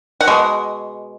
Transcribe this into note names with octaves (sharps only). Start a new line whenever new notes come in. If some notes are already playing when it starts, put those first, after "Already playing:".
F#5
B2 G#3